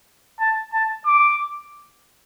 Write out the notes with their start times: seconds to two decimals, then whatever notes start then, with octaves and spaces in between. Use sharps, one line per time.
0.40 A5
0.73 A5
1.06 D6